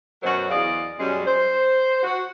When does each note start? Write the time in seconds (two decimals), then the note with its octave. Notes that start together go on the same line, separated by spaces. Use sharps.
0.22 F#2 B2 F#3 F#4 A#4 C5
0.50 E2 G#4 D5 D#5 F5
0.98 F#2 B2 G3 G#3 C#4
1.26 C5
2.03 F#4